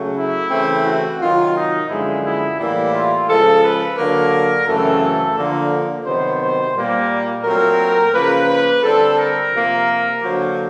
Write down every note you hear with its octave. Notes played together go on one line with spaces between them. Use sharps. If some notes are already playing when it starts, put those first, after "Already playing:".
Already playing: C#3 F#3 A3
E4
C#3 E3 A3 C4
F#4
C3 D#3 F#3 F4
D#4
F#2 D3 F3 G#3 B3 E4
E4
A2 E3 G3 A#3 E4
F4
C#3 F3 G#3 A4
B4
D3 F#3 A#3 A#4
F#2 C#3 E3 A3 C4 A4
D3 F3 A#3
C3 D#3 F#3 B3 C5
C5
A#2 G3 A#3
A#2 F#3 A3 C4 A#4
C#3 F3 A#3 B4
B4
D3 G3 C4 A4
A#4
C3 F3 A#3
D3 F#3 A#3 C5